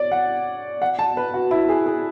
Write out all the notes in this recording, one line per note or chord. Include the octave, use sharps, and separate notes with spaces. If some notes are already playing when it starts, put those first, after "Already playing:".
Already playing: C#5 D5
F#5
F#5
A5
B4
F#4
E4
G#4
G#4